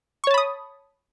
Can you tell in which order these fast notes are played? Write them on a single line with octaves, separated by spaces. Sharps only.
C#6 C#5 A5 B5 D#6